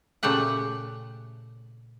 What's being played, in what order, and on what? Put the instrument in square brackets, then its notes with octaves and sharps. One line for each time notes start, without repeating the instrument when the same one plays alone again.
[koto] A#2 C#3 A3 G4 F#5